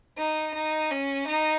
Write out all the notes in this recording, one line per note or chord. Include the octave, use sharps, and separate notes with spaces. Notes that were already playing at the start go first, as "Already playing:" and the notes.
D#4
D#4
C#4
D#4